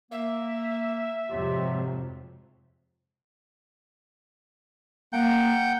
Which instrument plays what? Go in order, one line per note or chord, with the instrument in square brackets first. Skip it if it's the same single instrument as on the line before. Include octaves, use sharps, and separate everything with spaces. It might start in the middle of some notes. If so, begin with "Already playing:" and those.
[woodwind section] A#3 [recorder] E5
[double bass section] F2 G#2 C3 [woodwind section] F#3 F4 G4
[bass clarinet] A#3 [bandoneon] F#5 G5 G6